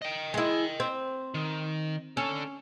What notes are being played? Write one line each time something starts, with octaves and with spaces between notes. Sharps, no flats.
D#5 G5
G#3 E4
C4
D#3
D3 C#4 A4